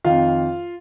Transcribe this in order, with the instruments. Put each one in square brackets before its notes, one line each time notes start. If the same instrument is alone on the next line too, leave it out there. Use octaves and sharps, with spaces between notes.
[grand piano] F2 D#3 F4 F5